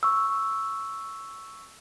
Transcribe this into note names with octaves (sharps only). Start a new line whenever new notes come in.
C#6 E6